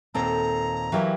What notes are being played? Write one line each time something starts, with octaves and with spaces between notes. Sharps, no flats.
D#2 A#2 C4 A4 A#5
E3 F#3 F#4 G4 A#4 F5